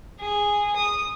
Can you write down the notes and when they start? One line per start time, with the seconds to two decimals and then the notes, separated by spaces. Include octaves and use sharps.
0.20 G#4
0.76 D#6